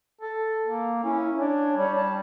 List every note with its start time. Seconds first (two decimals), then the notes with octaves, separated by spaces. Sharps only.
0.21 A4
0.67 A#3
1.04 C#4 E4
1.38 D4 C#5
1.77 G3 C#5
1.96 A5